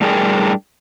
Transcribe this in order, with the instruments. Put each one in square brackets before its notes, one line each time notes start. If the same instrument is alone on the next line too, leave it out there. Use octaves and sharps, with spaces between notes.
[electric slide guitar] A2 G3 D4 G#4 A#4 G5